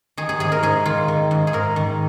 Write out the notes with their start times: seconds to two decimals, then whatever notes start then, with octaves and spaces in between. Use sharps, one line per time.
0.17 D#3 G#4
0.29 G#4
0.40 G#2 G#4
0.52 A#4
0.63 G#2 G#4
0.85 D#3 F4
1.08 D#3
1.31 G#2
1.47 G#4
1.53 G#2 A#4
1.76 D#3